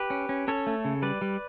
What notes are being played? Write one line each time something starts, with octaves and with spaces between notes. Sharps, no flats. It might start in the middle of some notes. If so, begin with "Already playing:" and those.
Already playing: G4 B4
C#4
C#4
C#4 A4 C#5
A3
C#3
G3 B4 D5
G3